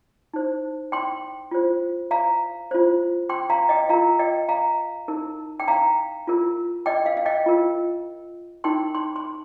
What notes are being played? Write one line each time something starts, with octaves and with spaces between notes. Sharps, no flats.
D#4 C5
G5 C6
F4 C5
F5 A#5
F4 C5
G5 C6
F5 A#5
D#5 G5
F4 A#4 F5 A#5
D#5 G5
F5 A#5
D#4 A#4
G5
F5 A#5
F4 A#4
D#5 G5
F5
F5
D#5 G5
F4 A#4
D#4 A#4 G5 C6
C6
C6